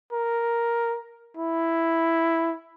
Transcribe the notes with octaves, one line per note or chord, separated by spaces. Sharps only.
A#4
E4